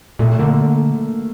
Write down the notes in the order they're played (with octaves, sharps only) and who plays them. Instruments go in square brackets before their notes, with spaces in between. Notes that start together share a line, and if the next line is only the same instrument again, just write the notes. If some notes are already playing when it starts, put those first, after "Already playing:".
[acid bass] A#2 [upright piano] A3
[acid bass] D3 [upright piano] A#3